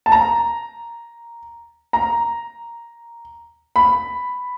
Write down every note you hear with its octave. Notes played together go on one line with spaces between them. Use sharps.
A5
A#5
A#5
B5